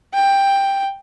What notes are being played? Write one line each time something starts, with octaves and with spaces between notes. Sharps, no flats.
G5